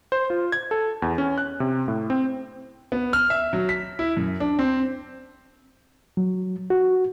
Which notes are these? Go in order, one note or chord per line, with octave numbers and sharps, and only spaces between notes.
C5
F4
G#6
A4
E2
C#4
F#6
C3
A2
C4
B3
F6
E5
F#3
B6
E4
F#2
D4
C4
F#3
F#4